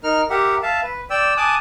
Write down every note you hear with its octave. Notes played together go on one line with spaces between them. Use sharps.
D#4 A#4 F6
G4 A#4 E5 F#5
E5 F5 A5
B4
D5 G5 E6
G#5 A5 D6 D#6 F#6